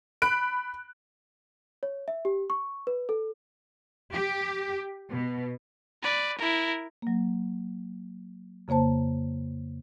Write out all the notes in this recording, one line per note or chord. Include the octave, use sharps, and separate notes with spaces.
B5 F#6 D7
C#5
E5
G4
C#6
B4
A4
G4
B2
B4 D5
E4 A#4
F#3 A#3
F2 C#3 A#3 C5 A5